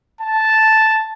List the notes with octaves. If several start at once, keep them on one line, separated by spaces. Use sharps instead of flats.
A5